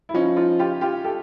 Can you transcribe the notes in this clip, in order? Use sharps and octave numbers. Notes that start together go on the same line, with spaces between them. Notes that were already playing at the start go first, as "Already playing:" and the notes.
E4
F3 C#4 D#4
D#4 F4
F4 G4
F4 G4
G4 A4